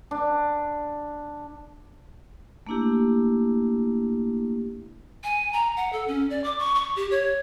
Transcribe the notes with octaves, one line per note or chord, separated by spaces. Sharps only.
D4
A3 A#3 D4 E4 G4
G#5
A#5
F#5
A4
C#4
D5
D6
C#6
C#6
G4
C#5